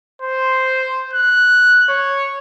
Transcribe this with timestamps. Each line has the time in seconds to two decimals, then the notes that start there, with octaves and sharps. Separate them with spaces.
0.22 C5
1.13 F#6
1.89 C#5